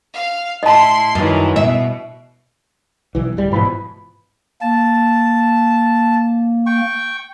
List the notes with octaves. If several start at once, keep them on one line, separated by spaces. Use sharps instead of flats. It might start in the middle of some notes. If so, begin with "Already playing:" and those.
F5
A2 E4 D#5 A5 C6
F#2 D#3 E3
B2 E5
B1 E3
D1 G3
G#2 B2 E3 F3 B5
A#3 A5
G5 C#6